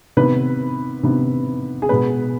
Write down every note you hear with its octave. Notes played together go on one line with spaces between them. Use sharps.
C3 D#3 B3 B4
C3 D#3 B3
G#4
B2 G#3 B3 B4